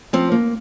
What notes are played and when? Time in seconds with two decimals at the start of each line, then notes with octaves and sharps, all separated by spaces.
0.13 F3 C4
0.31 A#3